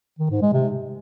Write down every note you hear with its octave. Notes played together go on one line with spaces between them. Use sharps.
D#3
G#2
G#3
C3